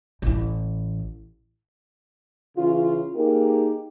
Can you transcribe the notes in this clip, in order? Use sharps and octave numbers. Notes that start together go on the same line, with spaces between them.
A1 E4
C#3 E3 F4
A#3 D#4 G4 G#4 A#4